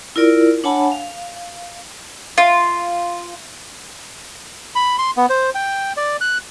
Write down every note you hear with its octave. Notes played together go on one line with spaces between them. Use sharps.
E4 F4 A#4 D5
D4 C#5 F#5 G#5 A5 B5
F5
F4
B5
C6
B3
C5
G5
D5
F#6